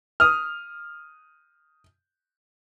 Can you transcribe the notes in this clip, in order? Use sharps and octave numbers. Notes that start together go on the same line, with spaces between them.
D#6 F6